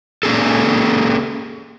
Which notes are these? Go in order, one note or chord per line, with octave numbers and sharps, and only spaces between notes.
A#3 C#4 G#4 A4